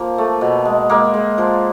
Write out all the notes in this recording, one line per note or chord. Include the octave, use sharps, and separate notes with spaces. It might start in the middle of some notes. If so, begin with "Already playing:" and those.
Already playing: F3 A#3
A3
B2
G#3
G#3 A#3
G#3
F3